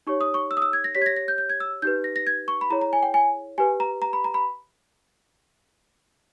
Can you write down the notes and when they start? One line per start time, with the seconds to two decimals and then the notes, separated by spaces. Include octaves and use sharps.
0.07 D#4 G4 C#5 C#6
0.21 D#6
0.34 C#6
0.51 E6
0.57 D#6
0.62 E6
0.73 G#6
0.84 A#6
0.95 G4 C#5 B6
1.02 G#6
1.06 A#6
1.16 A#6
1.28 G6
1.38 G6
1.50 G#6
1.60 E6
1.82 D#4 G4 B4 G6
2.04 A#6
2.16 A#6
2.27 G#6
2.48 C#6
2.61 B5
2.70 E4 G#4 C#5 A#5
2.81 A#5
2.93 G#5
3.03 G5
3.14 G#5
3.58 G4 B4 G#5
3.80 A#5
4.02 A#5
4.13 B5
4.24 A#5
4.34 B5